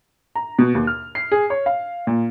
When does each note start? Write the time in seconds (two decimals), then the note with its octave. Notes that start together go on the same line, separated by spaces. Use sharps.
0.35 A#5
0.59 B2
0.75 D#2
0.87 F6
1.15 C7
1.32 G#4
1.50 C#5
1.66 F5
2.07 A#2